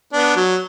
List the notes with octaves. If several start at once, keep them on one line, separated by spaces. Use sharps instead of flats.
B3 D4
F#3